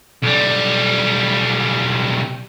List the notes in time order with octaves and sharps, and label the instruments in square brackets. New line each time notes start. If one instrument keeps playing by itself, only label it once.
[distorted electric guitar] B1 G3